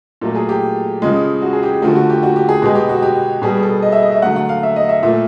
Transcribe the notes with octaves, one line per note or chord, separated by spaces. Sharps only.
A#2 F#3 A3 A4
G#4
G4
C#3 F3 G#3
F#4
G#4
G4
D3 F3 A3 F#4
F#4
G4
F#4
G4
G#4
B2 G#3 G4
G4
F#4
G4
B2 G3 G#4
A4
D#5
E5
D#5
E5
D3 F#3 A3 F#5
F#5
F5
E5
D#5
E5
A#2 F3 A3 E5